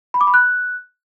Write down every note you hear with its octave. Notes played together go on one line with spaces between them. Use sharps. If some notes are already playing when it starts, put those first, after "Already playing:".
B5
D6
B5
F#6